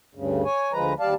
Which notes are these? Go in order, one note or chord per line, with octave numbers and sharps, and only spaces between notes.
D2 G2 C#3
C#5 G#5
D2 F3 G#3 B4 A#5
D#2 G3 D5 F5 A5